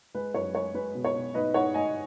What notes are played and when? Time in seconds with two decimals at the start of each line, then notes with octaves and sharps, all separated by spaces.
0.15 G#3 B4
0.34 F#2 C#5
0.54 G#3 C#5
0.74 G#3 B4
0.95 B2
1.05 C#5
1.15 B2
1.34 G#2 B4 D#5
1.54 G#2 C#5 F#5
1.74 G#2 D#5 G#5